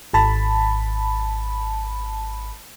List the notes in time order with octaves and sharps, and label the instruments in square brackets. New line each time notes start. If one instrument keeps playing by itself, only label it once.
[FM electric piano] G#1 A5 B5